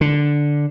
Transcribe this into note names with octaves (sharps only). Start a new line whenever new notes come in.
D3